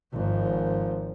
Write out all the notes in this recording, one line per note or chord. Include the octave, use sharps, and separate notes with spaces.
G#1 F3